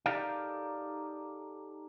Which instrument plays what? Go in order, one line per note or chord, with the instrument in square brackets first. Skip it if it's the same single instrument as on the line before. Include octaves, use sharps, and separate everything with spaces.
[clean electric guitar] D#4 G4 A4 A#4 D5 F5